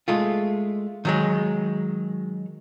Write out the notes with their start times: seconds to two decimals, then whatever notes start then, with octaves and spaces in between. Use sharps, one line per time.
0.08 G#3 A3 F4
1.05 D#3 F#3 G#3